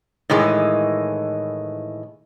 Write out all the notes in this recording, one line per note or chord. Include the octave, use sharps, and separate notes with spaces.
A2 D#3 E3 G#3